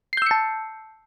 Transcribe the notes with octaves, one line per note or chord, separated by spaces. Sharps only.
A5 E6 G6 C7 C#7